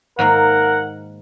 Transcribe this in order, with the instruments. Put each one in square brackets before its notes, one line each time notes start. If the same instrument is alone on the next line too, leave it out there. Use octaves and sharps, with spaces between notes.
[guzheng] G#2 D#3 A#3 [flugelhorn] A#4 [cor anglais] F#5